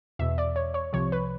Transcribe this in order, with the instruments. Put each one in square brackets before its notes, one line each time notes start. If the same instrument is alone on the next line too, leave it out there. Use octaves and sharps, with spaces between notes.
[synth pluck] E2 B2 E5
D5
C#5
C#5
C2 C3 F3 C#5
B4